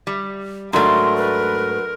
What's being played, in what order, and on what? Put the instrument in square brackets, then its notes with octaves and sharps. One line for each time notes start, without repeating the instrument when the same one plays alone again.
[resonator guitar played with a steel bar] G3
[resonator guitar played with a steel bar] G#2 A3 [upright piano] F#3 D4 [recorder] A#4 [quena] C6
[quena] B4